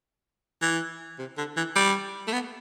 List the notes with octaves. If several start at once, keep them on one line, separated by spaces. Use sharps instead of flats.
E3
C3
D3
E3
G3
A3
B3